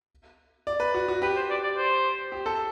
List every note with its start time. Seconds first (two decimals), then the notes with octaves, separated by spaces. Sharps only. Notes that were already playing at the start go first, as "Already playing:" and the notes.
0.67 D5
0.80 B4
0.94 F#4
1.08 F#4
1.22 G4 B4
1.36 C5
1.50 D5
1.63 D5
1.77 C5
2.32 G4
2.46 A4